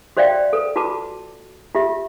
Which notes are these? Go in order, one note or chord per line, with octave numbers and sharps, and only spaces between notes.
F#4 C5 D5 E5 F5 G5
A4 B4
F4 F#4 B4 A5 D6
F4 G4 E5